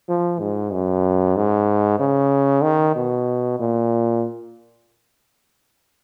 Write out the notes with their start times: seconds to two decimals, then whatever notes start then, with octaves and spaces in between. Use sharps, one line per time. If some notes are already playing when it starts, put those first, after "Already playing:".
0.08 F3
0.40 G#2
0.72 F#2
1.36 G#2
1.99 C#3
2.63 D#3
2.95 B2
3.59 A#2